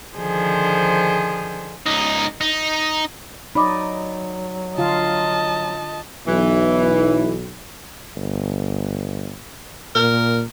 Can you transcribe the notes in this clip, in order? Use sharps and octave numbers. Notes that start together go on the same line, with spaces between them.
D3 D#3 F3 G#4 C5
C#2 D#4
D#4
F#3 D#4 D5 D#5 B5 D6
D3 F4 D#5 F5 A5
B1 E3
G1
A#2 A#4